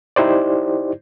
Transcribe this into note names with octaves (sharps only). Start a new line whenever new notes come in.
D#4 E4 G4 C5 D5